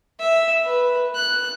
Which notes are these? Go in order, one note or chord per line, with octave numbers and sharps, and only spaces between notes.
E5
B4
F#6